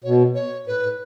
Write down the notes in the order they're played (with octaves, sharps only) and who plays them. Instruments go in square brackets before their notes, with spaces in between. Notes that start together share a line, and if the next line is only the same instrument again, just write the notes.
[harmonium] B2 [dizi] C#5
[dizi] C#5
[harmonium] A2 [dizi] B4
[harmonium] A2